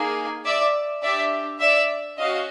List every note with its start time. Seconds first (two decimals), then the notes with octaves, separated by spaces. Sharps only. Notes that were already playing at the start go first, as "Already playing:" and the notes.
Already playing: A#3 D#4 G#4
0.44 D5 E5
1.02 D4 G4 D5 E5
1.60 D5 E5
2.18 C#4 F#4 D#5 F5